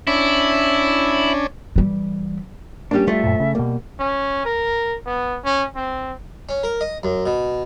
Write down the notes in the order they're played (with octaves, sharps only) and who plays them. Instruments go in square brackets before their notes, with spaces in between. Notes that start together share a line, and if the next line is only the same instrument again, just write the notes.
[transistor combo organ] C#4 D4 [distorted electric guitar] E4
[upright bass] E3 G3
[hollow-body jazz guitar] G3 D4 [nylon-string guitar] A#3 C#4 G4
[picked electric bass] G3 [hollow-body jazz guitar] A3 [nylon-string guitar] F4 C5 [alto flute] E5
[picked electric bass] F#2 A#2
C#3
[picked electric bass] B2 A#3 [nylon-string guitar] G3
[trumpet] C#4
A#4
B3
C#4
C4
[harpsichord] C#4
A#4
D#5
F#2
B2